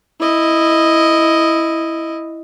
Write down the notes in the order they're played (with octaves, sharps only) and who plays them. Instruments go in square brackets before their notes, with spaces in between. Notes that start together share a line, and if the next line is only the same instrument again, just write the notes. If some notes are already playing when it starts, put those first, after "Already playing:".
[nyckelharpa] E4 D#5